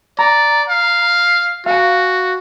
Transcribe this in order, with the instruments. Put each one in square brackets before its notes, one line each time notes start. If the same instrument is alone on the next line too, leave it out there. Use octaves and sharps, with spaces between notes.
[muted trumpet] D5 [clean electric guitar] A#5
[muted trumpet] F5
[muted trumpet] F#4 [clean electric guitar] F5 G#5